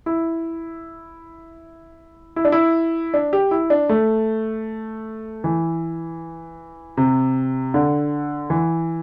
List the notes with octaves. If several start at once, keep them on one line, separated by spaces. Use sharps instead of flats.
E4
E4
D4
E4
D4
G4
E4
D4
A3
E3
C3
D3
E3